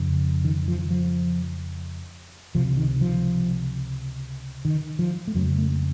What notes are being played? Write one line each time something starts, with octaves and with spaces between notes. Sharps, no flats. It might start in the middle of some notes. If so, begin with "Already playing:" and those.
Already playing: F2 C#3
D#3
F3
F3
C#2 C3 F3
D#3
F3
D#3
F3
A3
F2 C#3 F#3
A3